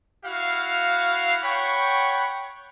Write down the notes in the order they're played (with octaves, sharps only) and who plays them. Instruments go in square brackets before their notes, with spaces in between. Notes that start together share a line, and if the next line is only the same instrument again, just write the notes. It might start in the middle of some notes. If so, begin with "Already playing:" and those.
[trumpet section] E4 F#4 F5
C#5 F#5 G5 B5 C#6